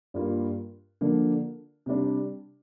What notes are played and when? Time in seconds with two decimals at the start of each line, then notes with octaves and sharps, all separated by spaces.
0.14 G2 G3 A#3 F4
1.01 D3 F3 A#3 D4
1.86 C3 G3 D4